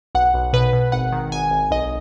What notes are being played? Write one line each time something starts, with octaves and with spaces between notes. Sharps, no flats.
B1 F#5
B1
B2 B4
B2
G#1 F#5
D#3
G#1 G#5
G#1
B1 D#5